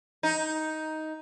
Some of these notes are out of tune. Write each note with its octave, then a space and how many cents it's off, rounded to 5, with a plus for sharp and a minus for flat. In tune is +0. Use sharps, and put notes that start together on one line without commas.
D#4 +10